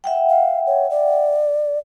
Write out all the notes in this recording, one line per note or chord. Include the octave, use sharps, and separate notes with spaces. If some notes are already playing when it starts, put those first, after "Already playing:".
E5 F#5 G5
F5
C#5
D5